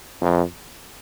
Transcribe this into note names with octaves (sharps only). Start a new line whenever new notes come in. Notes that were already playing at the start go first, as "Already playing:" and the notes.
F2